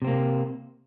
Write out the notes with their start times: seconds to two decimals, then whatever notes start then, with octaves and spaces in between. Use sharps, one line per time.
0.02 C3
0.04 C4
0.07 A#3